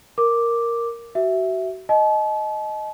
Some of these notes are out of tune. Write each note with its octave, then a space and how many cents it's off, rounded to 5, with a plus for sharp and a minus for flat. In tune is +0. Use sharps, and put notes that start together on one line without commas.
A#4 +0 D6 +0
F#4 +30 E5 +0
D#5 +0 A5 -40